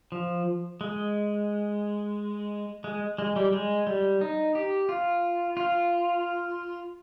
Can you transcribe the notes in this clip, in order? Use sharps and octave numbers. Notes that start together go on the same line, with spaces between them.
F3
G#3
G#3
G#3
G3
G#3
G3
D#4
G4
F4
F4